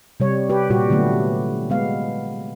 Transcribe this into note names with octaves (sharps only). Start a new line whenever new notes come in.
C3 G3 C#5
G4 B4
A#2 G3 F#4 G4
D3 F#3 A3 B3
G#3 B3 F5